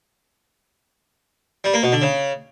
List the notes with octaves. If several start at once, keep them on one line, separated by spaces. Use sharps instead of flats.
G3
A#3
B2
D3
C#3